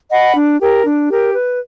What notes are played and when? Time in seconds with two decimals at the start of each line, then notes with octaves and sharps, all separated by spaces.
0.10 D#5 F#5 B5
0.34 D4
0.59 G4 A#4
0.84 D4
1.09 G4 A#4
1.34 B4